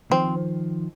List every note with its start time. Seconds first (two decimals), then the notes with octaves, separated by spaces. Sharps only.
0.11 D#3 F3 C4